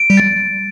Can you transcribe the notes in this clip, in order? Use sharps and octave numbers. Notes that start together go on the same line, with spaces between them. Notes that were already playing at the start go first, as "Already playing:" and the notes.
Already playing: D7
G3
A6